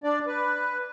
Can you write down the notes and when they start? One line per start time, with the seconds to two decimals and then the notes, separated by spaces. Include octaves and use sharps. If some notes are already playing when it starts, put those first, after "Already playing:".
0.04 D4 D5
0.27 B4